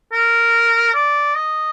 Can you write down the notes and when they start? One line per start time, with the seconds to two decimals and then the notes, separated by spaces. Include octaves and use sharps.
0.13 A#4
0.94 D5
1.35 D#5